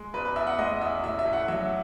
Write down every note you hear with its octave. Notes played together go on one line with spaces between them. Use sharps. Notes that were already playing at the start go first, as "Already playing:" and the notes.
Already playing: G#3
E2 B4
B4
E2 E5
F#5
G#3 D#5
E2 E5
A2 E5
E5
A2
F#5
F#3 E5